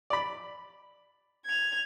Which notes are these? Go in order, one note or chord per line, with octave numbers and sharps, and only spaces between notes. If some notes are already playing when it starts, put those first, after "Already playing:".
D5 B5
G#6 F7